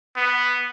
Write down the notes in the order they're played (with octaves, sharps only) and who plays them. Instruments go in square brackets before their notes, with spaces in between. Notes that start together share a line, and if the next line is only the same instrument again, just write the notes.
[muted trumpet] B3